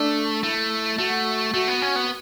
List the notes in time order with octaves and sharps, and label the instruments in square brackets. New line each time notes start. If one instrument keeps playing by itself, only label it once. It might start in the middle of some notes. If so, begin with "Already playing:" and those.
Already playing: [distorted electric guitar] A3 [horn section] D4
[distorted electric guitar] A3 [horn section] E4
[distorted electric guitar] A3 [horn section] F#4
[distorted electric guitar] A3 [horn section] F#4
[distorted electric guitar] B3
C#4
B3